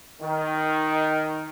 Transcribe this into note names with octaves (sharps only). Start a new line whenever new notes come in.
D#3